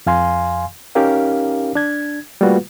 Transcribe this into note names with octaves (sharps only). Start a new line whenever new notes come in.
F2 F5 G#5 C6
C#4 D#4 G4 A#4 F5
D4 G#6
G3 A3 A#3 F4 F#4 B4